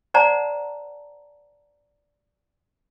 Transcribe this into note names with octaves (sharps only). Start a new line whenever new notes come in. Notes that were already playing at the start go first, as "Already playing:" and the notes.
C5 D5 F#5 A5 A#5